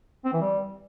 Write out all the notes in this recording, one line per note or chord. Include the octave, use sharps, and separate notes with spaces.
C4
E3
G3